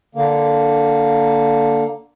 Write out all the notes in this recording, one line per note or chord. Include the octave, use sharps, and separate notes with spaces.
D3 A#3